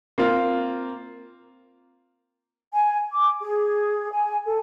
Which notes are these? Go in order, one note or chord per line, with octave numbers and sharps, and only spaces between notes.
A#3 C4 F4
G#5
D6
G#4
G#5
A4